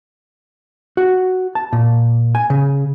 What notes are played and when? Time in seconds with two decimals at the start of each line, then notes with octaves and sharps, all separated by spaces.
0.97 F#4
1.55 A5
1.73 A#2
2.35 G#5
2.50 C#3